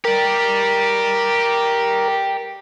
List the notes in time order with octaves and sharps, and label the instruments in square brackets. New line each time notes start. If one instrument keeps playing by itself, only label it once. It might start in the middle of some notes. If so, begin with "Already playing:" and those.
[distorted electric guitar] G4 D5 [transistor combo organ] A#4